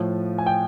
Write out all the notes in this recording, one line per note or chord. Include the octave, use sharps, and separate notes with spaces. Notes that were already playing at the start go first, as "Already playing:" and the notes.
Already playing: A2 F3
G#5
G5